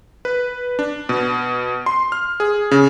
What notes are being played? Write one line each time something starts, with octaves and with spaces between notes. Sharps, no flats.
B4
D4
B2
C6
F6
G#4
C#3